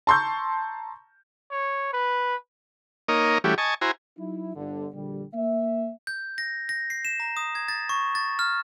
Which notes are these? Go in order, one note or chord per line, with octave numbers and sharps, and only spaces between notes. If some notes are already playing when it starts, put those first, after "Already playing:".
A5 A#5 C6 C#6 E6 G6
C#5
B4
A#3 D#4 A#4 C#5 D#5
E3 G3 A3 C#4 F#4 G4
D#5 G#5 A5 C#6
E4 F#4 C5 G#5 A#5
F#3 D#4 E4
G1 D3
A#1 D3 G3
A#3 E5
G6
A#6
A#6
C7
E7
A#5
D#6
G#6
A6
C#6
A6
F6